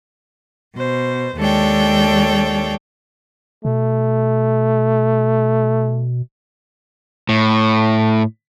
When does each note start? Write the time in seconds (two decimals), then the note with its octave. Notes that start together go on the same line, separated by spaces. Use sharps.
0.74 B2 C5
1.37 D#2 G#3 D4 A4 C#5 G5
3.65 B2 A3
7.29 A2